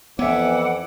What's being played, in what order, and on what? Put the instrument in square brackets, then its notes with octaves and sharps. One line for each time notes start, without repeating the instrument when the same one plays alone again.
[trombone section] F2 E3 [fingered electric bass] B3 [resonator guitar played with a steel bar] C#5 E5 [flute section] F#5 D6 E6